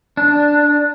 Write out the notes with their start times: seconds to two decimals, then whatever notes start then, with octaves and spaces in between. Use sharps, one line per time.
0.17 D4